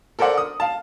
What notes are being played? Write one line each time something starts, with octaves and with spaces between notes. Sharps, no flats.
A4 A#4 C5 D5 F#5
D#6
F5 A5